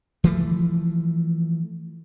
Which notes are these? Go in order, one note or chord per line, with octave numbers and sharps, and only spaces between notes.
E3 F3 A3